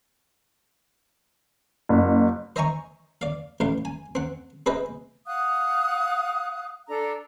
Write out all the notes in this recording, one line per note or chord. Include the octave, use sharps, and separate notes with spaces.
F#1
C5 D#5 E5 G#5 A#5 C#6
D5 F5
A1 A2 F5
G#5
C4 F#5
C4 G#4 B4 C5 D#5 E5
F5 F#5 D#6 F#6
D4 A4 A#5